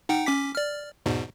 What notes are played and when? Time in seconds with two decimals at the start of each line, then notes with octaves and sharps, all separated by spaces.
0.09 D#4 F#5 G5
0.26 C#4 D6 B6
0.55 D5 F6
1.06 E2 G#2 B2